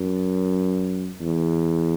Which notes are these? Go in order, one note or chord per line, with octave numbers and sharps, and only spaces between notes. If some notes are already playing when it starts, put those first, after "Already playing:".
Already playing: F#2
E2